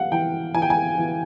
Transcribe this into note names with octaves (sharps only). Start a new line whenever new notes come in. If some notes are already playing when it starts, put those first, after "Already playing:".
Already playing: G3 F5 F#5
E3 G5
E3 G#5
G5
G#5
E3